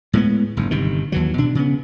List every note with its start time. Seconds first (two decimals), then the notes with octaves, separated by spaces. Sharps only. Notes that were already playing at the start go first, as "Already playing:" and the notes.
0.13 A2 G#3 A#3 B3
0.57 F#1 G#2
0.71 G1 C3 D#3
1.12 D#2 E3 F#3
1.38 B2 D4
1.55 C#3 B3